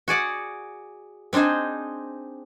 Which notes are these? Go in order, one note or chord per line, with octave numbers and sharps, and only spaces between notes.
F#4 G#4 D5 F#5
C4 D4 D#4 G#4 C5